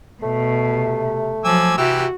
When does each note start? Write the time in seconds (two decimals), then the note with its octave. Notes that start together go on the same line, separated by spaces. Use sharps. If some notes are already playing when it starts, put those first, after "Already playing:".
0.23 B2 A3
0.64 C3
1.45 F3 F#3 G#5 D6 E6
1.78 C3 E3 F#4 G4 E6